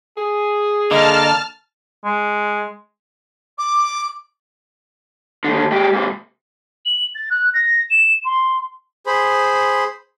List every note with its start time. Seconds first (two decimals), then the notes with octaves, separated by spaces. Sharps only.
0.17 G#4
0.91 D3 A#3 D#5 A5 F6
2.05 G#3
3.58 D6
5.44 D#2 D3
5.72 G#3 G4
5.93 G#2 C3
6.86 F#7
7.15 A6
7.30 F#6
7.54 A#6
7.90 E7
8.24 C6
9.06 G#4 C5 B5